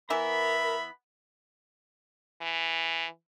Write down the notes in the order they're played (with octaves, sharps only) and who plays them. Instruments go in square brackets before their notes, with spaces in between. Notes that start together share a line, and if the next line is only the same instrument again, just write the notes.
[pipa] E3 B3 [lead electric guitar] A#4 [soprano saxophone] E5 [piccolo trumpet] B5
[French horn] E3